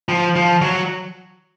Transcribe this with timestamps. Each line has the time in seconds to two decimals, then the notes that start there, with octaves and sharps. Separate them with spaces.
0.09 F3
0.36 F3
0.62 F#3